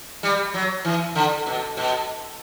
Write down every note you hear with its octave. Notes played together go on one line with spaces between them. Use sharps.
G3
F#3
E3
D3
B2
B2